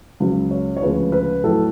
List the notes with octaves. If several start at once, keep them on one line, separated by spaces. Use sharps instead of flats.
C#2 C#3 F#3
C#5
C#5
D2 C#3 F3 G#3 B4
B4
A2 F#3 A4